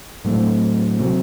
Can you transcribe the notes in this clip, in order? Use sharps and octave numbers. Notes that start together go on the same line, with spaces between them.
A2 F#3 A3 C4
C3 F#3 C4